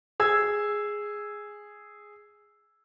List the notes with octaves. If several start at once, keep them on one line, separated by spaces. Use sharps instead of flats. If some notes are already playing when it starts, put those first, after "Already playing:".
G#4 E6 G#6